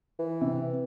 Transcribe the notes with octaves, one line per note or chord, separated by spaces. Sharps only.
E3
C3